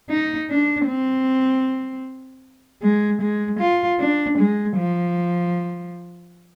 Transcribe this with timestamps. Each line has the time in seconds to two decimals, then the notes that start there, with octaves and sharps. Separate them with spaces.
0.10 D#4
0.50 D4
0.88 C4
2.83 G#3
3.22 G#3
3.60 F4
4.00 D4
4.38 G#3
4.77 F3